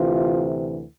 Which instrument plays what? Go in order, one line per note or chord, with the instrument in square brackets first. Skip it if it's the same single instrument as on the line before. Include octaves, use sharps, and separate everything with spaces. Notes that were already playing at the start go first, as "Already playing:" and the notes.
Already playing: [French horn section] D2 C3 E3 F4